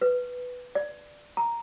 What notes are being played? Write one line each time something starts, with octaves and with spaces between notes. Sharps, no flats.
B4
D5
A#5